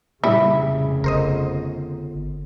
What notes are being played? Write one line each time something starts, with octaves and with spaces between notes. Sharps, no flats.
F1 A#2 C#3 G3 E4
G1 A#4 C5 D#5